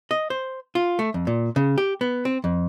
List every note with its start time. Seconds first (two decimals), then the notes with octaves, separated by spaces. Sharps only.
0.11 D#5
0.30 C5
0.75 F4
0.99 A3
1.14 F2
1.27 A#2
1.56 C#3
1.78 G4
2.01 B3
2.25 C4
2.44 F2